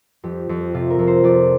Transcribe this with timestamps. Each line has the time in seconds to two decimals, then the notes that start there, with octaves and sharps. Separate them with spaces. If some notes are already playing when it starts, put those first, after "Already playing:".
0.23 F2 G4
0.49 F2
0.74 C3 F4
0.90 A#4
0.99 F2
1.07 C5
1.24 F2 D5